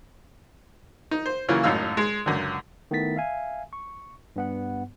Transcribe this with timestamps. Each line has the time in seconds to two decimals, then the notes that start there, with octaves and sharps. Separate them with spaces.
1.11 D#4
1.26 C5
1.48 C#3 E3 F#3 A#3 C#4 F4
1.64 G#1 F#2 A2 D#4 F5 E6
1.97 G#3
2.26 C#2 F#2 D3
2.91 D#3 A3 B3 E4 A6 B6
3.16 E5 F5 G#5
3.73 C#6
4.36 G2 B3 F#5